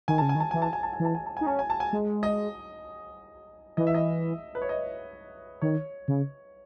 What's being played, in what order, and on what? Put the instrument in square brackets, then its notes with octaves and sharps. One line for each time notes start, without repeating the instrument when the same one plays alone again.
[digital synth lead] D#3 [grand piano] G#5
[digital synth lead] C#3 [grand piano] A5
[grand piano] G#5
[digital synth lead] D#3
[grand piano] A5
[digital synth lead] E3 [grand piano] G#5
[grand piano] A5
G#5
A5
G#5
[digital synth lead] E3
[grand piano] A5
G#5
A5
[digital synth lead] D#4 [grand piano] G#5
[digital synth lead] C#4 [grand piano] A5
[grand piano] G#5
A5
G#5
[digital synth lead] G#3
[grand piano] D#5
[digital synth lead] E3 [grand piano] D#5
[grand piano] E5
D#5
B4
C#5
D#5
[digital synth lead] D#3 [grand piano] C#5
[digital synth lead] C#3